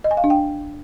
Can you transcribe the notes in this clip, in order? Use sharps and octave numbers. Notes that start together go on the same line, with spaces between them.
D#5
G#5
F5
D4
G5